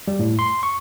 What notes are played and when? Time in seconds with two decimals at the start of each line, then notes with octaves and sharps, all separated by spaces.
0.08 G3
0.19 A2
0.39 C6
0.63 C#6